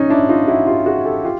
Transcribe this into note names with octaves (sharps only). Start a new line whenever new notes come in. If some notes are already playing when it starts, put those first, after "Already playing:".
Already playing: C#4 D#4
D4 E4
D#4 F4
E4 F#4
F4 G4
F#4 G#4
G4 A4
F4 G4